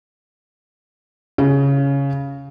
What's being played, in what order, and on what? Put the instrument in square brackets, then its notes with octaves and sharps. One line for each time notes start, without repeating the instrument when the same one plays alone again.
[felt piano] C#3